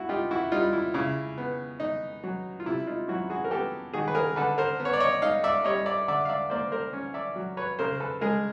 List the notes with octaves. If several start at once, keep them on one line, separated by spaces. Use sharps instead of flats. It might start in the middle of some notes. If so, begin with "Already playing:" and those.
Already playing: B3 E4 F#4
D#4 F4 G4
E4 F#4
G3 D#4 F4
E4
C#3 E4
B3
D#4
F#3
F4
C3 E4
D#4 F4
F#3 E4 F#4
F#4 G#4
A#4
B3 G4 A4
D#3 F#4 G#4
B4
G#4 A#4
D3 A4 B4
A#4 C5
B3
C#5
D5
C#5 D#5
D#4 D#5 F5
D5 E5
G3 C#5 D#5
D5 E5
D3 D5 E5
F5
D5 E5
A#3 C5 D5
A#4 C5
C#4
D5 E5
F#3
B4 C#5
C#3 A#4 C5
A4 B4
G#3 G#4 A#4